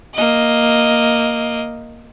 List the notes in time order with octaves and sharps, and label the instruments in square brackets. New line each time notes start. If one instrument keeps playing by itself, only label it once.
[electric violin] A#3 D#5